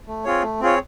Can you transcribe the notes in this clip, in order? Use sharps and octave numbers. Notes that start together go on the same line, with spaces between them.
A3
C4 F4 G#4 C#5
A3
C4 F4 G#4 C#5